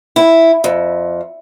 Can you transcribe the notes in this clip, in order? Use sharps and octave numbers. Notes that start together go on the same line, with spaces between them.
E4
F2